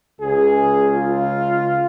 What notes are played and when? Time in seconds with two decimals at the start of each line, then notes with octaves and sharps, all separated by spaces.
0.21 C#2 C#3 G#4
0.96 F4